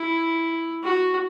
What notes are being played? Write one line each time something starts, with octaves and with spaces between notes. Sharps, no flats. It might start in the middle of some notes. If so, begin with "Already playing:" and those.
Already playing: E4
F#4